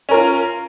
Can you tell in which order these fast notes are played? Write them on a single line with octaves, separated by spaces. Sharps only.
C#4 A#4 F4